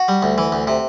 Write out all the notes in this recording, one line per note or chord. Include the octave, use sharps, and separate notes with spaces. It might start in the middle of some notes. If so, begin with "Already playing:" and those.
Already playing: F#4
G3
D2
E3
D2
C3